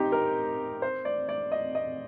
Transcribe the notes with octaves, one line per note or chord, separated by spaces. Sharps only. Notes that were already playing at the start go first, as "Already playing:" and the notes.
Already playing: C4 D#4 G4
A#4
C5
D5
D5
D#5
D#5